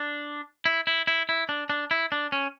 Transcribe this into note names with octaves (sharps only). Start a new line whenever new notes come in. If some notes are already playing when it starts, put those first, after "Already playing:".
Already playing: D4
E4
E4
E4
E4
D4
D4
E4
D4
C#4